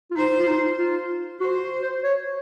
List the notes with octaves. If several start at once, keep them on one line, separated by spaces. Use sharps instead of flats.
F4
D#4 C5
F4
D#4
F4
F#4 C5
C5
C#5